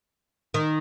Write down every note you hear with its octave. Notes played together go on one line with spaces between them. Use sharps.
D#3